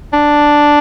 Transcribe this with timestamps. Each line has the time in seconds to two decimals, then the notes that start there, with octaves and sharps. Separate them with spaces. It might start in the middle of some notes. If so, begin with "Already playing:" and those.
0.13 D4